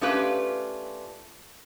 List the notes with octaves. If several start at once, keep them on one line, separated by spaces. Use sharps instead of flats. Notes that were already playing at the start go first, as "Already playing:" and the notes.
A3 C#4 D4 F4 G4 B4